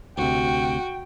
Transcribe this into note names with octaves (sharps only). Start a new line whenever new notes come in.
D2 C3 F#4 G5